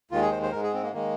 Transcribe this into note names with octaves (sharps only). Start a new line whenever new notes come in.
D#2 D#3 G#3 F4
G#4
C5
C5
G#2 G#3 A#4
G#4
C4
A#3
D#3 G#3 A#3